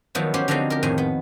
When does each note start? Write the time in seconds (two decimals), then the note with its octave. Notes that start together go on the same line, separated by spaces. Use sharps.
0.15 D#3 F3 F#3 B3 E4
0.34 C#4 F#4 G4 C5 C#5
0.48 D3 F3 F#3 G#3 C4 D#4
0.70 G4 A#4
0.83 F2 A2 D#3 C5 G#5
0.98 B3